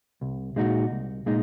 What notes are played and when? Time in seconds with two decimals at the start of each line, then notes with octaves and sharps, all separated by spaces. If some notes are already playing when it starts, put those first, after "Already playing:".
0.21 C2
0.56 A#2 G#3 D#4 F#4
0.91 C2
1.26 A#2 G#3 D#4